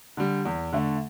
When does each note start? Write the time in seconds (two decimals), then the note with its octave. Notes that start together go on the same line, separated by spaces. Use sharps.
0.17 D3 G3
0.45 E2
0.73 D3 A3